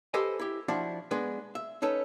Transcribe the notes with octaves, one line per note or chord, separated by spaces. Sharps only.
G4 A4 B4 C5 D#5 G#5
E4 G4
F3 D4 E4 F#4
G#3 B3 D4 B4
E5
C#4 D#4 A4 B4